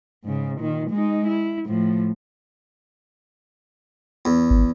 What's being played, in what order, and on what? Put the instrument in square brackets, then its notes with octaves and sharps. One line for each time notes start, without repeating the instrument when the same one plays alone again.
[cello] G#2 C#3
A#2 D#3
G#3 D#4
E4
A2 F3
[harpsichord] E2
[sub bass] G#1